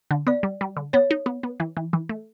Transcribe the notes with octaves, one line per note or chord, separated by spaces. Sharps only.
D3
B3 D5
G3
G3
D3
B3 C#5
D#4
B3
B3
E3
E3
E3
A3